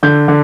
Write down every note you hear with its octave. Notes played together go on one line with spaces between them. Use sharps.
D3 G6
D3